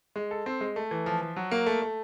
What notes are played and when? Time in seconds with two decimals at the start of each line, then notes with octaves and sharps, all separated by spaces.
0.16 G#3
0.31 A4
0.46 C4
0.61 G#3
0.76 A3
0.91 E3
1.06 F3
1.21 F3
1.36 F#3
1.51 A#3
1.66 A3
1.82 A3